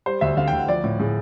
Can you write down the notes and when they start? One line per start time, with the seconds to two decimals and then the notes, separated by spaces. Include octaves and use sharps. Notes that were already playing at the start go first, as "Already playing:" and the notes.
0.06 G3 C5
0.21 D2 E5
0.37 D3 F5
0.48 G5
0.53 D2
0.58 F#5
0.68 F3 D5
0.84 A2
0.99 A2 G#4